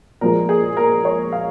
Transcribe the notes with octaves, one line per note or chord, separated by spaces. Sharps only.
A#2 F3 G#3 A#4
G#4
A#4
C#5
F5